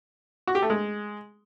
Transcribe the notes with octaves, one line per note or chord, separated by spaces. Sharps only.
F#4
G4
A3
G#3